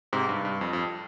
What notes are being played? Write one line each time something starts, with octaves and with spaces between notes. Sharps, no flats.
G#2 C3
G2
G2
F2
F2